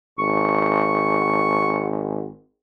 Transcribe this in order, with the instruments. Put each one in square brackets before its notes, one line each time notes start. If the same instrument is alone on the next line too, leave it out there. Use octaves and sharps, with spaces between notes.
[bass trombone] G#1 [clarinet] C#6